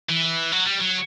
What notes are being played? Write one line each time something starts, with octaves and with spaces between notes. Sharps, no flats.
E3
F#3
G3
F#3